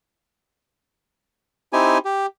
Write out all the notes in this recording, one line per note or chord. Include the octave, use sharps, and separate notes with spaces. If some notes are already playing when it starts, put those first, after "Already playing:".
C4 D#4 E4 G4 G#5
G4